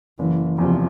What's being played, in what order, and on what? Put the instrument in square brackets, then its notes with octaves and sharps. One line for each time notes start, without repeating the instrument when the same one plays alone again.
[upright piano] F#1 [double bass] E3
[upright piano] E2 C3 [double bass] F3